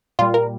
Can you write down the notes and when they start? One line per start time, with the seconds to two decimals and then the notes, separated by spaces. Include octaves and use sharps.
0.19 A#2 G3 F4
0.34 A#4